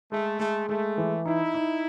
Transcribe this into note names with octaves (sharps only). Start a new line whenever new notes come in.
G#3 A3
G#3 A3
G#3 A3
E3
D#4 E4
D#4